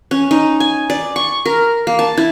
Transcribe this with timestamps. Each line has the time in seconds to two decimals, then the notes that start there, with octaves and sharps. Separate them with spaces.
0.11 C#4
0.31 D#4
0.60 G#5
0.90 D5
1.16 C#6
1.45 A#4
1.87 A#3
1.99 A5
2.17 E4